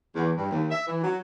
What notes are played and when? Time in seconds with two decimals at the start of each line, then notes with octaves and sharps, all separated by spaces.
0.16 E2
0.37 G2
0.51 D#2
0.70 E5
0.86 E3
1.04 F#3